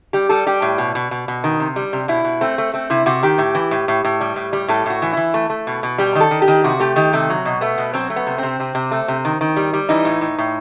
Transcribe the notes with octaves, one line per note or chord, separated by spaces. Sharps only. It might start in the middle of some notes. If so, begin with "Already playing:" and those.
G3 G4
G3 A4
G3 G4
A2
B2
B2
B2
B2
D#3
C3
G3
C3
B2 E4
B2
A3 C4
A3
A3 C4
C3 E4
C3 F#4
D#3 G4
A2
E3
A2
A2
A2
G3
A2
G3
A2 A4
A2 F#4
E3
E3 E4
A3
A3
B2
B2
G3 G4
D#3
A4
D#3
G4
D#3
C3 F#4
A3 G4
D#3 G4
C3 A3
F#3
B2
A3 B3
B2
F#3 C4
A3
B3
C3
C4
C3
C3
C3
A3
C3
D#3
D#3
G3
G3
E3 D#4
A2
A2
A2